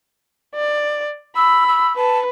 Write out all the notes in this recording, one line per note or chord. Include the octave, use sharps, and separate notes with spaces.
D5
B5 E6
E6
B4 A5